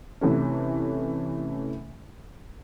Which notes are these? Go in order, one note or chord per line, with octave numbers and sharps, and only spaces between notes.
C3 E3 A3 C#4